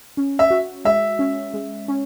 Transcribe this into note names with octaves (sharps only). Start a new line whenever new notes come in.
C#4
E5
F#4
G#3 E5
C#4
G#3
C#4